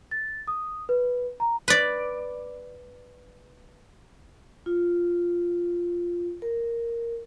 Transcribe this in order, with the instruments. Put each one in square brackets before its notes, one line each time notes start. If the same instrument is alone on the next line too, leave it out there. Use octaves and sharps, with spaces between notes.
[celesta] A6
D#6
B4
A#5
[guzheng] B4 D5
[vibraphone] F4
A#4